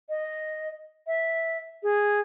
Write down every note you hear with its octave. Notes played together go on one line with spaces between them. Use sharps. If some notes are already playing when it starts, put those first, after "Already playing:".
D#5
E5
G#4